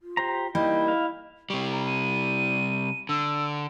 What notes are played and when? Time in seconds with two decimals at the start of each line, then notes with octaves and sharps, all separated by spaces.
0.02 F4
0.17 G4 C5 A#5
0.55 G3 A#3 D#4 E4 D#5 G5
0.88 F5
1.50 C3 G3 C#6
1.72 A#5
1.86 D#7
3.09 D3 E6